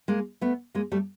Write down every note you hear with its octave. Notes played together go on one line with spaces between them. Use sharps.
G#3 A#3
A3 B3
G#3 A#3
G3 A3